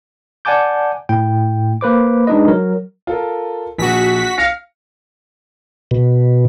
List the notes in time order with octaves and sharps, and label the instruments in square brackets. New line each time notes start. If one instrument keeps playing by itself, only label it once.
[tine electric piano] D5 F#5 G#5 A5 D6 G6
A2 G5
A#3 B4 C5 D6
G#3 D4 D#4 B4 D#5
F#3 A#4
[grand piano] F4 A4 A#4
[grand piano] A#1 [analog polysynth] F#4 B6
[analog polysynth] F5 [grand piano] F6 A#6 C#7
[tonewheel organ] B2